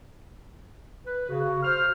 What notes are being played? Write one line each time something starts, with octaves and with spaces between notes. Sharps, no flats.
B4
C#3 F#4
C5 F6